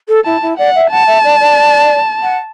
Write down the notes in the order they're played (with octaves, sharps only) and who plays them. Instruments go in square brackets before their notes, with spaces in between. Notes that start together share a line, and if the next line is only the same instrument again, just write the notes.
[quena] A4
[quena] E4 [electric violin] A5
[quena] E4
[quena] D5 [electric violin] F#5
[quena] E5
[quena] F#5 [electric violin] A5
[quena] E5
D5
D5
F#5